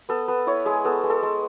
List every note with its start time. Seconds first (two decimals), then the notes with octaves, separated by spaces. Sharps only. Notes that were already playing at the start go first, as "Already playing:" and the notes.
0.09 B3 A4
0.28 B3 B4
0.47 E4 C#5
0.65 G#3 G#4
0.84 B3 A4
1.04 G#3
1.10 A4
1.23 G#3